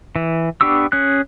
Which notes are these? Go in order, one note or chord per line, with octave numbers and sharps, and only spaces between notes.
E3
B3 D4 G4 C#6 E6
C#4 G#4 F#6